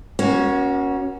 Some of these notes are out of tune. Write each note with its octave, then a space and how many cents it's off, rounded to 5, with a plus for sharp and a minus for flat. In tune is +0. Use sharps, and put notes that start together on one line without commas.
A#3 +40 C#4 +0 F#4 +0